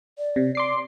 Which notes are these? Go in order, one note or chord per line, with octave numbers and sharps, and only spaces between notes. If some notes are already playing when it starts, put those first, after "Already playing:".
D5
C3
D5 C6 D6 C7